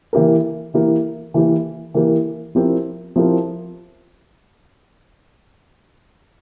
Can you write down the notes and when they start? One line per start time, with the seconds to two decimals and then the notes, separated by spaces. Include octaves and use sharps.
0.13 E3 A#3 E4 G4 A#4
0.74 E3 A#3 E4 G4 A#4
1.34 E3 A#3 E4 G4 A#4
1.94 E3 A#3 E4 G4 A#4
2.55 F3 C4 E4 G4 A#4
3.16 F3 C4 E4 G4 A#4